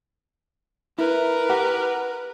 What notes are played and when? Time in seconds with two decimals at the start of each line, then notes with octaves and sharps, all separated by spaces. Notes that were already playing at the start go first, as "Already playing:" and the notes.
0.99 E4 A#4 B4
1.50 G4 F#5